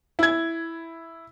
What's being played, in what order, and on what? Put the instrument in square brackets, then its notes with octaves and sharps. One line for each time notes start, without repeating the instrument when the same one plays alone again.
[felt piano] E4 G#6